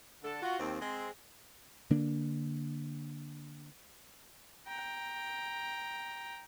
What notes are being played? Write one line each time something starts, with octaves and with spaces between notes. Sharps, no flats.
D3 D4 A4
F4 F#4
D#2 C4
G#3 C4
D3 A#3 D4
G5 A#5